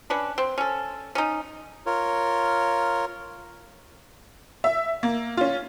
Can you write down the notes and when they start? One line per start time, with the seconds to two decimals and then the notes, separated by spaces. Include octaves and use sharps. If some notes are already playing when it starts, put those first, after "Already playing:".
0.10 C#4 D4 B4
0.38 C4
0.58 C#4 A4
1.15 C#4 D#4
1.86 F4 A#4 C#5
4.64 E5
5.03 A#3
5.37 C#4 F4